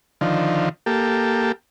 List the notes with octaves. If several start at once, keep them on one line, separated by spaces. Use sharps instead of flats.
D3 D#3 F3
A#3 G4 A4